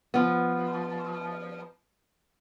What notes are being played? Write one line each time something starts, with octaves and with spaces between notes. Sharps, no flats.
F3 B3